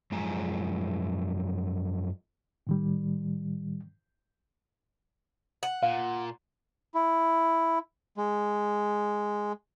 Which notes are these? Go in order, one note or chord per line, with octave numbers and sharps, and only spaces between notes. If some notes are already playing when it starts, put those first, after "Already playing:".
F#2 F3 G#3 G#4 G#5 A#5
A2 D#3 G3
F#5
A#2 F5
E4
G#3